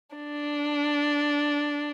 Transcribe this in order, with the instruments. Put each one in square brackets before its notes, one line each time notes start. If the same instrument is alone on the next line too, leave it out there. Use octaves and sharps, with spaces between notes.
[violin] D4